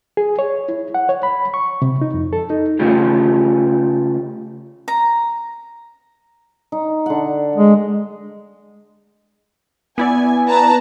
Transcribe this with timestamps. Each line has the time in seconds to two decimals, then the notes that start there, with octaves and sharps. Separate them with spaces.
0.17 G#4
0.39 C#5
0.69 E4
0.94 F#5
1.09 C#5
1.23 B5
1.54 C#6
1.82 C3
2.01 D#4
2.14 F2
2.33 A4
2.50 D#4
2.79 C#3 A3 C#4 F4 G4
4.88 A#5
6.72 D#4
7.06 D3 F#5
7.56 G#3
9.98 B3 E4 D5 G#5
10.48 B4 A5 A#5